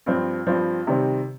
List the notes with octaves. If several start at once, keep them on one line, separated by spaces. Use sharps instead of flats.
G2 F3 C4
G2 F3 C4
C3 D#3 G3 C4